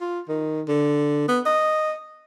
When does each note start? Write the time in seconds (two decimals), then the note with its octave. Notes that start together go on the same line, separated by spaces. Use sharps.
0.01 F4
0.28 D#3
0.68 D3
1.28 B3
1.46 D#5